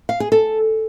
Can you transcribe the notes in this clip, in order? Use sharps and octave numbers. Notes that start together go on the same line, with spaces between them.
F5
G#4
A4